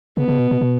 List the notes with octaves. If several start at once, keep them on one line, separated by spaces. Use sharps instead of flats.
C#3 B3
C#3
B2
B2
B2